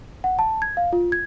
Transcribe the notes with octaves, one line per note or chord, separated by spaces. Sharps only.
F#5
A5
G#6
F5
F4
G#6